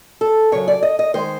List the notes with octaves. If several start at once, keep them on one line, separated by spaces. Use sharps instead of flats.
A4
F#2 C#3 F#3 C#5
D5
D#5
D#5
D#3 G#3 C5